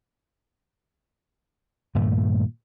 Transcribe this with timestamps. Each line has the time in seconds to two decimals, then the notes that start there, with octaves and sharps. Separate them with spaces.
1.95 G2 A#2 D#3 A3